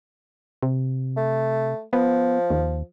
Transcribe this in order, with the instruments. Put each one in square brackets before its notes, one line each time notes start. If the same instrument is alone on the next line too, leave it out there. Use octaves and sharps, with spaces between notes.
[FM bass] C3
[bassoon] A3
[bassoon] F3 [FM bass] B3
[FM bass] D#2